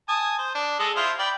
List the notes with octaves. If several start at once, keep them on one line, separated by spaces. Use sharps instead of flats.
G#5 A5 D#6
C5
D4
G#3 A4 D#5
E4 F4 C5
D5 G5 B5